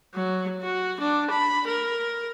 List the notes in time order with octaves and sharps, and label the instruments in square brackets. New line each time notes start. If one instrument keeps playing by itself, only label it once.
[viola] F#3
F#4
D4
B5
A#4